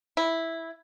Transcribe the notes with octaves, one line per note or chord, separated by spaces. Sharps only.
E4